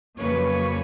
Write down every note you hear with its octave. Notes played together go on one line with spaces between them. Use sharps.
F2 C#3 F#3 A#3 B4 C#5